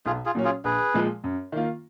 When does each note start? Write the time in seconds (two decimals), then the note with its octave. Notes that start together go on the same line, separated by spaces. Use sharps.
0.06 B1 F4 G#4
0.26 F4 G#4
0.35 A#2 F#3 C#4
0.44 F4 G#4
0.64 A#1 G#4 B4
0.94 A#2 F3 G#3
1.24 F#2
1.52 D#3 A#3 F4